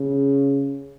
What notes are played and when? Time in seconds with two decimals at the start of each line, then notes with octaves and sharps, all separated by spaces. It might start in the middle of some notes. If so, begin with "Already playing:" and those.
Already playing: C#3